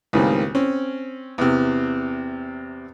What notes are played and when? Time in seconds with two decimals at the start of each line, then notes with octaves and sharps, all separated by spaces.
0.13 C#2 A2 D#3 G3 A#3 C4
0.55 C4 C#4
1.38 E2 C3